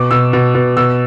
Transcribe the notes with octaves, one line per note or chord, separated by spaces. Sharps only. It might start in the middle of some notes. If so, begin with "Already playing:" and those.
Already playing: B2 D6
B2 E6
B2
B2
B2 E6